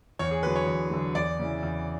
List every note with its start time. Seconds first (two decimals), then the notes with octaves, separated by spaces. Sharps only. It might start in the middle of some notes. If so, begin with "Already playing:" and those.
0.19 E2 C#5
0.31 G#4
0.43 D3 F#3 B4
0.56 C#5
0.67 E2
0.90 D3 F#3
1.15 E2 D5
1.39 C#3 E3
1.63 E2